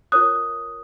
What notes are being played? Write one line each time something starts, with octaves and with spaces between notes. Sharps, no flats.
F4 A#4 C#5 D#6 F#6